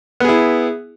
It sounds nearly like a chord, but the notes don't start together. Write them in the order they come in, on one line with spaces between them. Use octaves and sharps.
B3 G#4 E4